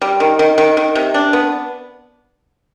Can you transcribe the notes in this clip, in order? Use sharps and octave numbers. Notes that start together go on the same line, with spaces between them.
G3
D#3
D#3
D#3
D#3
C3
D4
B3